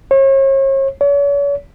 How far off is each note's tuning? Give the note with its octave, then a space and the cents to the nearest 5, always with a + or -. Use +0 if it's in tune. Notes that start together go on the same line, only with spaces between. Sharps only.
C#5 -40
C#5 +40